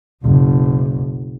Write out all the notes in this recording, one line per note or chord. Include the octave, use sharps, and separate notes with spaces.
F#1 B1